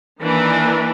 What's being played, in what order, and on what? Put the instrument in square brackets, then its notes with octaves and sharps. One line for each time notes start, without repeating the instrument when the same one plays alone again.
[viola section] D#3 E3 A#3 D4 A#4 B4